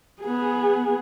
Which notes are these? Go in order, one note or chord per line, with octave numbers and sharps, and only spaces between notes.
B3 G#4